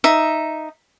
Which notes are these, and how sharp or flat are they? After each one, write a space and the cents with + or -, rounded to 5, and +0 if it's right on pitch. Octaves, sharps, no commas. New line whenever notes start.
D#4 +0 E5 +0